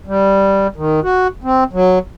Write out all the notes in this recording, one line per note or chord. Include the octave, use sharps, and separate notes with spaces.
G3
D#3
F#4
C4
F#3